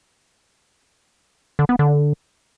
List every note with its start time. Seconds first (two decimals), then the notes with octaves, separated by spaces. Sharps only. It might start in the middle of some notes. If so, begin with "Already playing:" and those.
1.59 D3
1.69 B3
1.79 D3